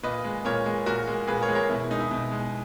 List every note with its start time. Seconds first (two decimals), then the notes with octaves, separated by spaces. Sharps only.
0.03 A#2 B4 D#5
0.24 G#3
0.45 A#2 A#4 C#5
0.66 G#3
0.86 A#2 F#4 A#4
1.07 G#3
1.28 A#2 G#4 B4
1.42 A#4 C#5
1.49 G#3
1.55 A#4 C#5
1.69 B2 E4
1.80 E4
1.91 G#3 D#4
2.00 E4
2.11 B2
2.32 G#3